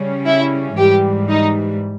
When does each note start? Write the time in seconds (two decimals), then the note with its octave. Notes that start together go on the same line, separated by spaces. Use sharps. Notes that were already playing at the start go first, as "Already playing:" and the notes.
Already playing: C#3 G3 C#4
0.26 E4
0.77 G#2 E3 G3 G4
1.29 D#4